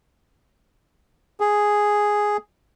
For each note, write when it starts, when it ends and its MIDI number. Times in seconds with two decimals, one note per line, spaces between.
1.40 2.37 68